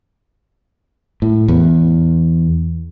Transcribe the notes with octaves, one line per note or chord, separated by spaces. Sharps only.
A2
E2